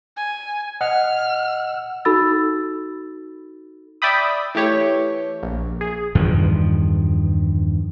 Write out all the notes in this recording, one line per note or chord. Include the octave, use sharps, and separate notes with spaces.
G#5
D#5 F#5 F6
D#4 F#4 A4 B5 E6 A6
D5 E5 G5 B5 D#6
E3 A3 G4 C#5
A#1
G#4
E2 G2 D#3 F3